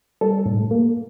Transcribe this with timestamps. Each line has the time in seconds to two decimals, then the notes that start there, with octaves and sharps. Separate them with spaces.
0.21 G3 A4
0.46 A2
0.71 A#3